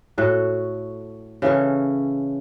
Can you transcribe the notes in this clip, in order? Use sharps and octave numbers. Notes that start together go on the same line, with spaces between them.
A2 F#4 A4
C#3 E3 C#4 A4